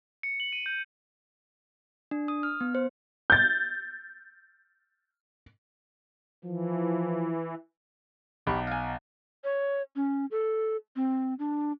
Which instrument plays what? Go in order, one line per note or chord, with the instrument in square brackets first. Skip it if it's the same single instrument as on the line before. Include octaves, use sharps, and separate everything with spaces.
[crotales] C#7
F#7
D#7
G6
[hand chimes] D4
D#6
F6
B3
C5
[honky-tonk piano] G6 A6
[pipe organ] E3 [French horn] F3
[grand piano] B1 [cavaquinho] G4 B5 C#6
[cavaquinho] F5 G#5
[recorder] C#5
C#4
A4
C4
D4